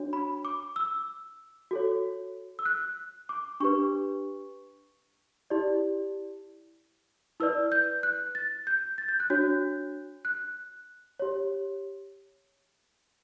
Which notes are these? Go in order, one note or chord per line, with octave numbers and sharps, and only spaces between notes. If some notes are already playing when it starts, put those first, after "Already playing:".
Already playing: D4 F#4 C#5
B5
D6
E6
F#4 A4 C#5
E6
F#6
D6
D4 G4 B4 C#6
E4 G4 D5
E4 B4 D5 E6
G6
F#6
A6
G6
A6
G6
F#6
D4 F#4 C#5 G6
F#6
G4 C#5